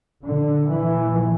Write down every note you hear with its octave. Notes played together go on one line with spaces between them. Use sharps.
A#2 D3
E3